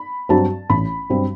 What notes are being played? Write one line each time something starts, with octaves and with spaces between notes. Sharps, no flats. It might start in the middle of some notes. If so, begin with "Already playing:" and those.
Already playing: B5
G2 F#3 C4 A5
A1 B5
G2 F#3 C4